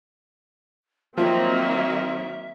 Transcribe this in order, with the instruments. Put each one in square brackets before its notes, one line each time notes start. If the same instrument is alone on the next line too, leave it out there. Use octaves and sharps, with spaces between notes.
[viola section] D#3 F#3 A#3 [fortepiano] F3 [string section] C4 [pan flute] E5